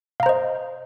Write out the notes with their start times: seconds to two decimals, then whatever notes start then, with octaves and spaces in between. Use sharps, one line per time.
0.20 F5
0.23 A#5
0.26 C5
0.29 D#5